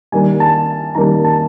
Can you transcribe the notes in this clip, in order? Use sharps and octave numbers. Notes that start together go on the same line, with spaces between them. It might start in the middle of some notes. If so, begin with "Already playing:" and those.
D#3 G3 A#3 G#5
A5
D#3 G3 A#3 A#5
A5